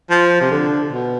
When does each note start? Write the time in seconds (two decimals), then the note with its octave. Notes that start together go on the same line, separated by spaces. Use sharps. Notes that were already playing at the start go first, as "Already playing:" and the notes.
0.11 F3
0.41 C3
0.51 D3
0.92 B2